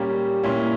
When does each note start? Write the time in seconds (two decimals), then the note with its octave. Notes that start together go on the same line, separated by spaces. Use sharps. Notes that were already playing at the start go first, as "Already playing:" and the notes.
Already playing: A#2 G3 A#3 C#4 G4
0.43 A#2 A#3 C#4 E4